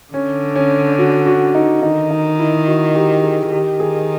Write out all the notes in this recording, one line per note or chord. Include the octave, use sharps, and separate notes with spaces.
D3 C#4
C#4
F#4
F#4
D#4
D#3 D#4
D#4
E4
F#4
G4
G#4
D#3 G4
G#4